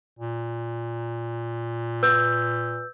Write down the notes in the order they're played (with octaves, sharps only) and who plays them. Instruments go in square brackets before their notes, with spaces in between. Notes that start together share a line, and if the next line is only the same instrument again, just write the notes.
[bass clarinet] A#2
[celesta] B4 E6 G6